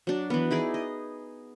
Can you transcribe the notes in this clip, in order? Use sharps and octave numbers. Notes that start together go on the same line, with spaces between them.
F#3 D4
E3 B3
D#4 E4 G#4 D5
D#5